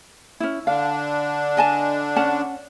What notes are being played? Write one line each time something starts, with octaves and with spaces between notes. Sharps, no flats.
C#4 E4
D3 D4 F5
D#5 G#5 A5
C#4 F#5 A5